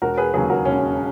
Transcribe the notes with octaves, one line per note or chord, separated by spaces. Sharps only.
E1 F#4 A#4
G#4 B4
D#2 C#3 F#3 G#4 B4
F#4 A#4
E1 C#4